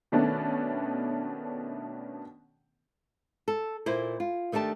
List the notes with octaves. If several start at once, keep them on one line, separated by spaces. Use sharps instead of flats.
B2 D#3 A3 B3 C#4 D4
A4
A#2 E4 C5
F4
D#3 A3 D4 G4 A5